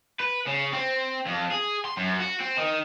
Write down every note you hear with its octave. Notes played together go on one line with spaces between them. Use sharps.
B4
C#3
C4
F2
G#4
C6
F#2
F#4
C4
D#3